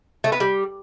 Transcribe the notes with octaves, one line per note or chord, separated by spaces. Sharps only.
A3
B3
G3